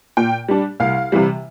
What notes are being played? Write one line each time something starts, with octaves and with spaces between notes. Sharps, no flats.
A#2 G5
G3 D4
C2 F5
C3 E3 G3